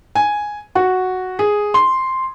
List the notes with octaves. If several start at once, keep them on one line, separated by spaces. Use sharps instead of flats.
G#5
F#4
G#4
C6